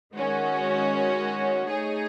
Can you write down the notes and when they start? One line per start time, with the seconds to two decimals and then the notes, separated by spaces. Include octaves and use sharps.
0.15 D#3 G#3 C#4 F#4
1.69 A3 D#4 G#4 C#5